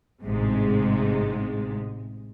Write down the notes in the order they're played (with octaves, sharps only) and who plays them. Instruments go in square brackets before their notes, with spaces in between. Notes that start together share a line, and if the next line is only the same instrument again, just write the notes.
[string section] A1 G#2 C3 G#3